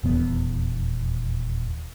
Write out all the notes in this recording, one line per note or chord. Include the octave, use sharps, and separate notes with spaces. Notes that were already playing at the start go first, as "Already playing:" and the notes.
D#1 E2 B3